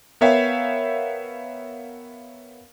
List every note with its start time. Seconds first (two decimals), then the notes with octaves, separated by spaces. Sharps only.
0.21 B3 A#4 C#5 E5 F5 G5